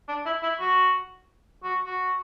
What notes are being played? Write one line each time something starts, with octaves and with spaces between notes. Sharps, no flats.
D4
E4
E4
F#4
F#4
F#4